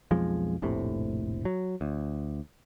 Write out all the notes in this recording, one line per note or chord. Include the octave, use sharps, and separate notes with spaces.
B1 F2 F3 G#3
F1 A#1 A2 C3
F#3
D2